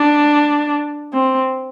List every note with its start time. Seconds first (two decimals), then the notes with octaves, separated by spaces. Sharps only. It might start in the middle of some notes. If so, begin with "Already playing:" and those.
Already playing: D4
1.13 C4